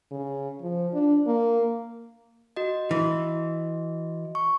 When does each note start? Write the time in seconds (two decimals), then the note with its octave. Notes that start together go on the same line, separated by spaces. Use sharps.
0.11 C#3
0.62 F3
0.94 D4
1.27 A#3
2.56 F#4 D#5
2.91 E3
4.35 C#6